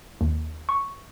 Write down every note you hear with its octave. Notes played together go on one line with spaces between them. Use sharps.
D#2
C#6